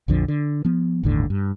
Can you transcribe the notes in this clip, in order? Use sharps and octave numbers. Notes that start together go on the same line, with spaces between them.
A#1 F2 D3 F3
D3
F3 B3
G1 D#2 A2 D3
G2